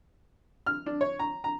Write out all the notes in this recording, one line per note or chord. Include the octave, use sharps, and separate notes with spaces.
F6
D4
C#5
A#5
A#5